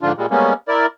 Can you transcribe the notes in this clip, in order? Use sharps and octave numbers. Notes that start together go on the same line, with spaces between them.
G#2 D3 F3 D4 F4
A#2 G3 G#3
G3 G#3 A#3 B3 C#4
E4 A#4 D5